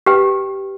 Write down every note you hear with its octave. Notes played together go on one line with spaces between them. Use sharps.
G4 B4 G5